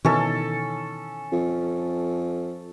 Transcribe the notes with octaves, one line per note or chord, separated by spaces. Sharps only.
B2 D#3 E3 C#4 A4
F2